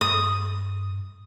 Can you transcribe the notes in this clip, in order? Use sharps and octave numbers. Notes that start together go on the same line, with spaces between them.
G2 D#6